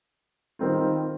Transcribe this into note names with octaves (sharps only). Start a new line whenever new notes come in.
D#3 G3 C4 F4